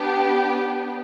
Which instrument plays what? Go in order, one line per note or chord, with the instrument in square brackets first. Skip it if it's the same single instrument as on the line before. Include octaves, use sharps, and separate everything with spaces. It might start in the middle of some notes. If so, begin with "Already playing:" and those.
Already playing: [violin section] B3 D4 G4